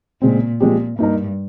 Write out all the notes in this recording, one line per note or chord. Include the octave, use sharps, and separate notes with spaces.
A#2 C#3 G#3 C4
A#2 F3 G#3 C4 G4
G2 A#3 D#4 A#4